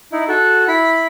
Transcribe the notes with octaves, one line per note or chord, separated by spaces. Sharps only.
D#4 E4
F#4 A4
E4 B5